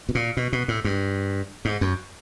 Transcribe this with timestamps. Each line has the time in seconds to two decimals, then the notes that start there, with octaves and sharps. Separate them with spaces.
0.09 B2
0.15 A#2
0.37 B2
0.53 B2
0.68 A2
0.84 G2
1.65 G#2
1.81 F#2